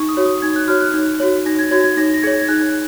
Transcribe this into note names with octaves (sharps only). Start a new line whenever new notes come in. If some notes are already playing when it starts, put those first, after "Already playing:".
Already playing: D#4 C#6
D#6
F#4 C#5
D#6
D#4 G#6
F#6
F#4 C#5 F6
F#6
D#4
F#4 C#5
D#4 A#6
G#6
F#4 C#5 G#6
G#6
D#4 A#6
A#6
G#4 C#5 G#6
G#6
D#4 F#6